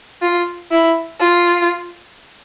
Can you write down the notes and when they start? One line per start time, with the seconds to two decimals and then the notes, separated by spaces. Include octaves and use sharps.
0.22 F4
0.71 E4
1.21 F4